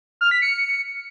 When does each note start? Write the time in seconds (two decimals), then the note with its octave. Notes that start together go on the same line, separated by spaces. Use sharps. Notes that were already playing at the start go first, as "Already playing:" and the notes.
0.21 F6
0.31 B6
0.42 C#7